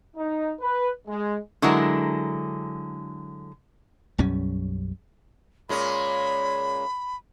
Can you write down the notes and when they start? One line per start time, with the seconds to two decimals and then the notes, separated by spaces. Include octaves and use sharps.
0.16 D#4
0.61 B4
1.08 G#3
1.62 D3 F#3 G#3 E4 A#4
4.18 B1 F#2 G3 C#4
5.69 A#2 G#3 C#4 B5